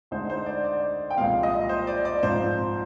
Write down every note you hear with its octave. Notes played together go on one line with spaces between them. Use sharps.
D2 D3 G#3 D#4 C5
C5
D5
D5
G5
C2 A#2 F3 G#3 C4 F5
D#5
C5
D5
D5
G#2 F3 C4 C5